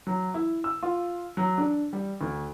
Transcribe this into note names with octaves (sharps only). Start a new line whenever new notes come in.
F#3
E4
E6
F4
F#3
D4
G3
D2